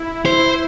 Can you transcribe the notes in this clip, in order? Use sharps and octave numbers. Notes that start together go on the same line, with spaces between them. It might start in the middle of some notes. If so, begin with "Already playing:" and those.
Already playing: E4
C5